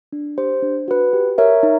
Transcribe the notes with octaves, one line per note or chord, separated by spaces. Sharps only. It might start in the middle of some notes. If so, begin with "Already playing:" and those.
D4
G4 C5
D4
F#4 B4
G4
A#4 C#5 E5
D#4